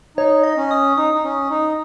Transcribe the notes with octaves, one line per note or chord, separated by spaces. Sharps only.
D#4 C#5
D#5
C#4
D#6
D#4 D#6
D#4
C#4
D#4